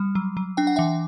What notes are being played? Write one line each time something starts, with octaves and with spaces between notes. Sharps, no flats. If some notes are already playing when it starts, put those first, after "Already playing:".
Already playing: G3
F#3
F#3
D4 G5
F#5
E3 E5 G5